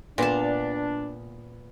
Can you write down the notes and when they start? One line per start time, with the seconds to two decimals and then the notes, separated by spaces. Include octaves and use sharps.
0.18 A#2 B3 D4 F5 A5